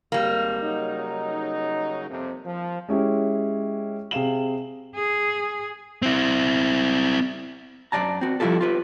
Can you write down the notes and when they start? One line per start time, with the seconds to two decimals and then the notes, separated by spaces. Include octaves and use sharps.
0.12 G#1 G3 A#3
0.62 C#3 F#3 D#4
2.09 F2 C3
2.45 F3
2.88 G#3 C#4 E4 G4
4.11 C3 G#4 F5 E7 F#7
4.95 G#4
6.02 C4 E4
7.92 F#2 F3 D5 A5 A#5
8.21 C4 F#4
8.40 F3 G3 E4 F4 G4 A4
8.61 F4 G4 B4